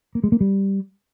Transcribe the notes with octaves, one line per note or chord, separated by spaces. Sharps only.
A#3
G#3
A#3
G3